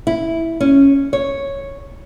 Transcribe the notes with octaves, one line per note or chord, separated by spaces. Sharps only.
E4
C#4
C#5